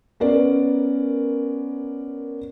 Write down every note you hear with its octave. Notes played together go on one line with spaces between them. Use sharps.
B3 C#4 A#4 D5